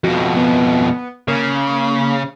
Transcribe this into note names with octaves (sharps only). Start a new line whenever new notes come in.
F2 B2 F#4
B3
C#3 A#3